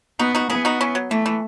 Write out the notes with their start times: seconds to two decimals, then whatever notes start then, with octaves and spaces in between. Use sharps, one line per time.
0.19 B3 D#4 F#4
0.35 D#4 F#4
0.50 B3 E4 G#4
0.65 D#4 F#4
0.81 C#4 E4
0.95 F#3
1.11 E3 A3
1.26 E3